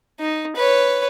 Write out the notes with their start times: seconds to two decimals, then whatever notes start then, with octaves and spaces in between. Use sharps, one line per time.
0.20 D#4
0.56 B4 C#5